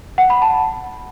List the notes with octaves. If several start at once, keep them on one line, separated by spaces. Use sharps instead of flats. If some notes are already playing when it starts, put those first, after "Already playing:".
F#5
B5
A5